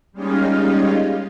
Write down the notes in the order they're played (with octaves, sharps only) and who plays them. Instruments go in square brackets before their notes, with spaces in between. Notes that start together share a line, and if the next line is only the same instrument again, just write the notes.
[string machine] G3 G#3 A#3 C#4 D#4 F4